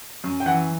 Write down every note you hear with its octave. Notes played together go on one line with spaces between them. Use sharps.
F#2
G5
E3 F#5